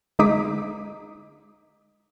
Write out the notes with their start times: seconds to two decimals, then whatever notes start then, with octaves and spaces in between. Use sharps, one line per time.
0.19 D3 G#3 D#4 D6 D#6 B6